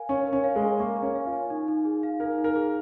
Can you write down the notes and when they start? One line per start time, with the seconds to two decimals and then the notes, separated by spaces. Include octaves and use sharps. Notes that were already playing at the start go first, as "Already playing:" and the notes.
Already playing: A#4 F5 G#5
0.09 C#4 C#6
0.27 A#4
0.33 C#4
0.44 F5
0.56 G#3
0.62 G#5
0.79 A#3 C#6
0.96 A#4
1.02 C#4
1.15 F5
1.27 F4
1.33 G#5
1.50 D#4
1.68 D#4
1.85 G#4
2.03 F5
2.20 D#4 A#4
2.38 D#4
2.44 A#4
2.56 G#4